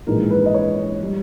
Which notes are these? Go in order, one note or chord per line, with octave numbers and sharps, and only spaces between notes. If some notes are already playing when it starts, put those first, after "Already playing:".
A#1 G#2 E3 G#3 A#4
B4
D#5
C#5
G3